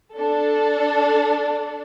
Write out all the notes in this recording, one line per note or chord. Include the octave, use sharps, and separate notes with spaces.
D4 A4